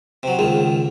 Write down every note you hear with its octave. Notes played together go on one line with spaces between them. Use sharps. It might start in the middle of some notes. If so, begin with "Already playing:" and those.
C3 F#3
C#2 D#3 G#4